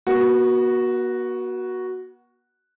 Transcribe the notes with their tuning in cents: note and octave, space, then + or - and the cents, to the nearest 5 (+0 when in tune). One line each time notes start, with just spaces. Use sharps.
B3 -45 F#4 +0